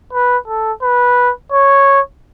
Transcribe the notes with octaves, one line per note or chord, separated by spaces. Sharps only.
B4
A4
B4
C#5